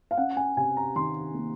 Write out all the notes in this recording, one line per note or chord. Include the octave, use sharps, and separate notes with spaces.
F5
C#4 F#5
G#5
C3 G#5
A#5
D#3 C6
A#3